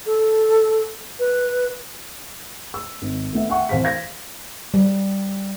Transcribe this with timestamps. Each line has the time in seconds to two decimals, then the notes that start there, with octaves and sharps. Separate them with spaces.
0.06 A4
1.19 B4
2.74 E6
3.02 G#1
3.33 A3 B3 E5
3.49 E5 F#5 G5 C#6
3.69 C2 E3 C5 F5 A5 B6
3.84 F5 G#6 A#6
4.74 G3